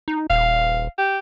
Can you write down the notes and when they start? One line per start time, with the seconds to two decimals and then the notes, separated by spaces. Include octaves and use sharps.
0.08 D#4
0.30 D#1 F5
0.98 G4